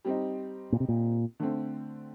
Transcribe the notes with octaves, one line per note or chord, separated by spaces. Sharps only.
G3 C4 D#4
A#2
C3
A#2
D3 A3 C4